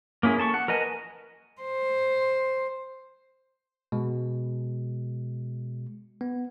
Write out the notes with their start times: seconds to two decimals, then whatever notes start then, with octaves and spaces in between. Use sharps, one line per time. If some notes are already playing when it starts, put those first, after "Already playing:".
0.23 A#3 C#4 E4 G#4
0.38 A4 A5 C6 C#6
0.54 F#5
0.68 A#4 B4 D#5 G#5 A5
1.61 C5
3.92 B2 G#3
6.21 B3